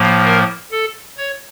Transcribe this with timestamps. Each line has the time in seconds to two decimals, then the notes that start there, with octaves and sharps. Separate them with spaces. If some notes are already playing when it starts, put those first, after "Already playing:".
Already playing: A2 F3 A#3
0.25 A#4
0.72 A4
1.17 C#5